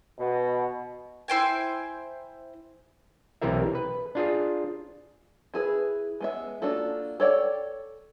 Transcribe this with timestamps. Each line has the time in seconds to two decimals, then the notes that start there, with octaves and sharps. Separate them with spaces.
0.18 B2
1.28 E4 C5 G5 G#5
3.42 B1 C3 E3 G4 A#4 E5
3.75 B4
4.15 D4 F4 G#4
5.54 E4 G#4 A#4 B4
6.21 G#3 B3 E5
6.62 A#3 D4 F4 F#4 A4
7.20 A4 C#5 D5 F#5 G5